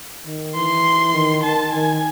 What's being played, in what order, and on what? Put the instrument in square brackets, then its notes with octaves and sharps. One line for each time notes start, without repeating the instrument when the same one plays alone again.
[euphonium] D#3
[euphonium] E3 [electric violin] C6
[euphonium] D#3
[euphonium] D#3 [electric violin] A5
[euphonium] D#3 [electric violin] G#5